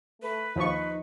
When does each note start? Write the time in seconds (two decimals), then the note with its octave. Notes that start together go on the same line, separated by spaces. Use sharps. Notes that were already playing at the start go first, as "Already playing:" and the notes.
0.22 A3 B4
0.56 D#2 F3 D#4 C#6